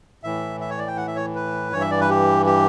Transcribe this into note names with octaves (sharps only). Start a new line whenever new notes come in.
A2 E3 E5
E5
C#5
D5
G5
F#5
E5
C#5
B4
G2 E3 C#5
E5
D5
B4
G4
G4